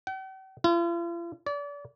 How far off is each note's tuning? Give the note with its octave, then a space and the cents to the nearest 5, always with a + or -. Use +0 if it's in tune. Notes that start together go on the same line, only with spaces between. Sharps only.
G5 -45
F4 -45
D5 -35